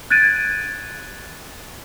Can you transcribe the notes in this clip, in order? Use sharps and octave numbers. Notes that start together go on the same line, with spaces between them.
F#6 G#6 A6 D7 D#7